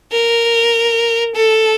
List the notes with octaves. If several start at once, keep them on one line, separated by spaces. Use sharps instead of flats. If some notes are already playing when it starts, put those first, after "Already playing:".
A#4
A4